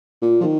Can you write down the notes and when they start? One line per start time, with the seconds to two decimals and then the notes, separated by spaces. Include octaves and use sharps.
0.22 A#2
0.41 F3
0.44 D#3